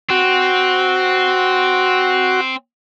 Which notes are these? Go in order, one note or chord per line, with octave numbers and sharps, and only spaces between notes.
C4 F#4